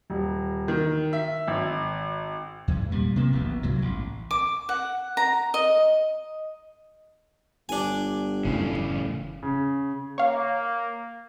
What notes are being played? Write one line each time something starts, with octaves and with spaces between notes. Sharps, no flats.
D#1
D#3
E5
G#1
E2 G#2
A#2 G3
C3 A#3 B3
D1 A#1 D#2 B3
C2 G#2 F#3
A1
D6
F#5
A#5
D#5
G1 D4 G#5
F#1 A2 C#3 E3
C#3
A#3 C#5 F5